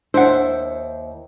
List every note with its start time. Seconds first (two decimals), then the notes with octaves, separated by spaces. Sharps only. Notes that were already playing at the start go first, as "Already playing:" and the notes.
0.14 D#2 D4 E4 C5 F#5